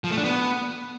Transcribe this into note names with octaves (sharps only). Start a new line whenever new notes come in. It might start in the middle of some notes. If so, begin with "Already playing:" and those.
F3
A3
D4
B3